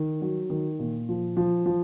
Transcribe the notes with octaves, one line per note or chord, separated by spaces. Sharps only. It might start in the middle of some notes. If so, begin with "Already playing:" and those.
Already playing: D#3
F#3
D#3
A#2
F3
F3
F3